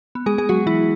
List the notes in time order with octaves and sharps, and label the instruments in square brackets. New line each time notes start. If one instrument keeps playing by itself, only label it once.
[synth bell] B3
G#3 G#4
G#3 G#4
F#3 F#4
E3 E4